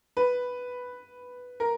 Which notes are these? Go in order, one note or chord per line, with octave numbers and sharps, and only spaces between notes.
B4
A#4